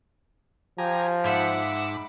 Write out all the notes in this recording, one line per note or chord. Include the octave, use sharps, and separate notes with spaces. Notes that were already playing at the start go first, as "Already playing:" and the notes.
F3 G4 G#5 A#5
G#2 E5 F#5 B5 D6